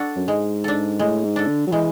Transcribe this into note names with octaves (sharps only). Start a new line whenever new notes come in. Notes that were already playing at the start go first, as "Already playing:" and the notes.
Already playing: D4 F#4 A4
F#2
G#2 G#3
D4 A4
A2 G#3
G#2
D4 A4
D3
F#3
E3 G#3